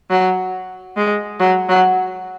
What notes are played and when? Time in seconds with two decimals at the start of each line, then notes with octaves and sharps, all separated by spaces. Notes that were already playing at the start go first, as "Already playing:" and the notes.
0.10 F#3
0.97 G#3
1.40 F#3
1.69 F#3